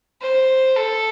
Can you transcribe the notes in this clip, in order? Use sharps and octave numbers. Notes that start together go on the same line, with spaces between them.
C5
A4